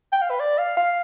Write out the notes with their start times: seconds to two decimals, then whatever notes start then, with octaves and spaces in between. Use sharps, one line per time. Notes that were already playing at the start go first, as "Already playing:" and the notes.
0.12 G5
0.22 F5
0.30 B4
0.40 D5
0.58 F5
0.77 F5